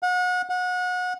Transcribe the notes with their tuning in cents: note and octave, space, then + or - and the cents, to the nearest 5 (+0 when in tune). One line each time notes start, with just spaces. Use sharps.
F#5 -35
F#5 -30